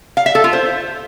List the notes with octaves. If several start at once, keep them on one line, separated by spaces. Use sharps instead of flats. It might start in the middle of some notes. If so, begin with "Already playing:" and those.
F5
E5
A4
F4
C5